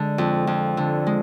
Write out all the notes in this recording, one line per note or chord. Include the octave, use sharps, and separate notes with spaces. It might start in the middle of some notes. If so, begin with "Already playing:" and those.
Already playing: D3 G#3
F2
F2
D3
G#3